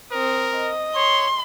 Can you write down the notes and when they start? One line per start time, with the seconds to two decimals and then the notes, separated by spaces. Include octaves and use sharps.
0.11 C4 A#4 D#6
0.55 D#5
0.95 C#5 C6